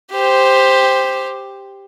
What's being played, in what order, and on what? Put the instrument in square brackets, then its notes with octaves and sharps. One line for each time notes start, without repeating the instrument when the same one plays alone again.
[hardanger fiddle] G4 C5